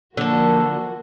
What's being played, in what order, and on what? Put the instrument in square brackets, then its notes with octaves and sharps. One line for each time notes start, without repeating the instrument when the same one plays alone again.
[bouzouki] D3 A4 [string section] F3 A#3 F#4